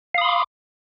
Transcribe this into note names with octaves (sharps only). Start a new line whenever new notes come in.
F5 B5 C6 D6 D#6